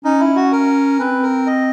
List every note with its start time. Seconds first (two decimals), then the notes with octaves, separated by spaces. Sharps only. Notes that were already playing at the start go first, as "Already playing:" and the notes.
0.04 C#4 D#4
0.20 E4
0.36 F#4
0.52 A#4
1.00 C4 B4
1.23 A#4
1.47 D#5